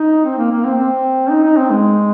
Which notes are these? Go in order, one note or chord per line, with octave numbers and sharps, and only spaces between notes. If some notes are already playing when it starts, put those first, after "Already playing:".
Already playing: D#4
C4
A#3
A#3
C4
C4
D#4
D#4
C4
G#3